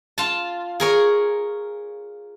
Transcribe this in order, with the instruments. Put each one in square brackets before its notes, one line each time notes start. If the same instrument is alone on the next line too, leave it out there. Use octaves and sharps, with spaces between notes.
[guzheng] F4 A5
G#4 A#4 C#5